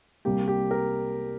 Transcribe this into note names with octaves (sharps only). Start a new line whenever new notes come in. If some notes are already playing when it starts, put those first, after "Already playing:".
C2 C3 G3 A#3 G4
G4
A#4